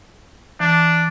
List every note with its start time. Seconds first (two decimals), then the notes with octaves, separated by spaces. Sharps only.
0.60 E3 D4